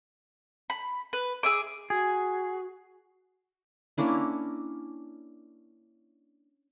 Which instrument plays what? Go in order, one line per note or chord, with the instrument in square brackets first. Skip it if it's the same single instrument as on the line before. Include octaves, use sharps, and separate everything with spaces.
[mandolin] B5
B4
G#4 E5 D6
[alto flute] F#4 [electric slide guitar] G#4
[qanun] A#3 C#4 D4 E4